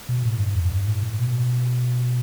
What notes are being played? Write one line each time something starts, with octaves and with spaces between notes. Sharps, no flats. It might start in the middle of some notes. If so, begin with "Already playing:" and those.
B2
A2
G2
F2
G2
A2
A2
B2